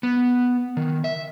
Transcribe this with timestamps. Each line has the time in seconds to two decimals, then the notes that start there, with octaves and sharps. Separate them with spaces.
0.03 B3
0.77 D#3
1.04 E5